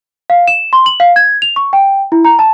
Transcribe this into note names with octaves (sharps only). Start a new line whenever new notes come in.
F5
E7
C6
F#7
F5
G#6
F7
C#6
G5
E4
A#5
A5